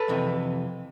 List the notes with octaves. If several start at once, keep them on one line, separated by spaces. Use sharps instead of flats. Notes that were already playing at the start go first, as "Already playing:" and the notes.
Already playing: A4 B4
F2 C3 E3